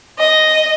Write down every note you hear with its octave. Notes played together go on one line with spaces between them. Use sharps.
D#5